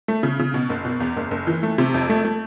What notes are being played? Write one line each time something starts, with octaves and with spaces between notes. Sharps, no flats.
A3
C#3
C#3
B2
F#1
B2
E2
F#1
F#1
E3
A3
C3
F2
A3
A3